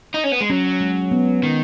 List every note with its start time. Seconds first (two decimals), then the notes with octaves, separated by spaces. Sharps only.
0.14 D#4
0.24 C#4
0.32 B3
0.41 G#3
0.50 F#3 C#4
0.81 G#3
1.11 B3
1.43 D#3